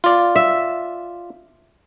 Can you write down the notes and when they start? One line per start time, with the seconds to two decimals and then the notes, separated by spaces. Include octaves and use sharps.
0.04 F4 D5
0.35 E5